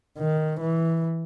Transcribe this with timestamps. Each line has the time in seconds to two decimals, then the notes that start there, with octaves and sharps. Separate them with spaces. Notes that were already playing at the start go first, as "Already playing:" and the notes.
0.19 D#3
0.61 E3